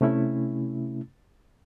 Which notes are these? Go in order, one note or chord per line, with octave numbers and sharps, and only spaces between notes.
C3 A3 C#4 E4